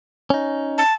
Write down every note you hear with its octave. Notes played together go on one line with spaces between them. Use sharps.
C#4 D#4
A5